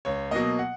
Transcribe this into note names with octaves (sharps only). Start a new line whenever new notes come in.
C#2 C#5
B2 F#3 A#3 D#5
F#5